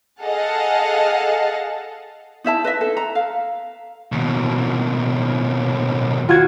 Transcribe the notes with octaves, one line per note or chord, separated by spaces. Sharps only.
G#4 A4 D#5 F5 F#5 A5
D#4 E4 E5 A5
B4 D#5 E5
A4
A#5
F5
D#2 B2
F4 F#4 G#6